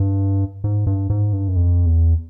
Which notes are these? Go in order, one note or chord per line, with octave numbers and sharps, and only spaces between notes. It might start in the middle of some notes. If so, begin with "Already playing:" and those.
Already playing: G2
G#2
G2
G#2
G2
F#2
F2
E2